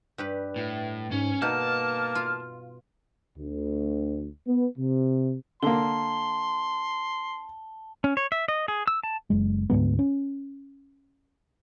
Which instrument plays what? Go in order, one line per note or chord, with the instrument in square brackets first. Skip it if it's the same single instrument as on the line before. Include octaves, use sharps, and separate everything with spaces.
[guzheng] G2 G4 B4
[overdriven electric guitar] A2
[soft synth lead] G#2 [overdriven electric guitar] C#4
[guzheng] B2 D#4 [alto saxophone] A#3 [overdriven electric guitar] A5 [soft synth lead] F6
[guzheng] F4
[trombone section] D2
B3
C3
[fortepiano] D3 A#3 [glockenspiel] A5 G7 [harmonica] C6
[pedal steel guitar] C#4
C#5
E5
D#5
G#4
E6
A5
[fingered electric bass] F#1 G#3
D2 G#2 G3 B3
C#4